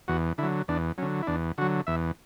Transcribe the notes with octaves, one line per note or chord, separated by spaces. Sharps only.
E2 F#4
D3 F#3 E4
E2 D4
D3 F#3 C#4
E4
E2 D4
D3 F#3 F#4
E2 E5